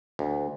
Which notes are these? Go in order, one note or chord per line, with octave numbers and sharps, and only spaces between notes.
D2